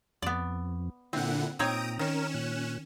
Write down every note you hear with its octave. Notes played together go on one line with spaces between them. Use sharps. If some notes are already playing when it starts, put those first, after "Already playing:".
F2 B3 D5
A#2 D3 C4 E4 F#5
A#2 C4 D#4 C#5 G5 A#5 D#6 D7
D#3 C#4 A#4 E7
A#2 F#6